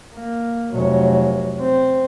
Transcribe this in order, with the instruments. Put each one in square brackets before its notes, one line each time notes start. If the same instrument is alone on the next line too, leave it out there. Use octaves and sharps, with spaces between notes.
[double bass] A#3
F1 F#3
C4